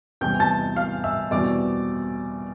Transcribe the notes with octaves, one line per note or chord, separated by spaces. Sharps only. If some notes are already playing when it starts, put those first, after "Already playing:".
E2 C3 E3 G3 C4 G5 G6
A5 A6
F5 F6
E5 E6
E2 B2 G3 C4 D5 D6